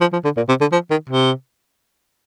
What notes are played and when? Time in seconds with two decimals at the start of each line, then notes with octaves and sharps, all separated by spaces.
0.01 F3
0.13 F3
0.24 D3
0.37 A#2
0.49 C3
0.61 D3
0.72 F3
0.90 D#3
1.09 C3